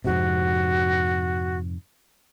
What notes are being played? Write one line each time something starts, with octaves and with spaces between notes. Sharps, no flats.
F2 G#2 C3 F#4